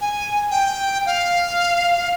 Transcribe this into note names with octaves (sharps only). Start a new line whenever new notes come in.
G#5
G5
F5